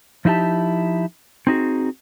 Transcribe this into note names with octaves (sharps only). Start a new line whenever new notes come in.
F3 D#4 E4 G4 A5
C4 D#4 F#4 G#4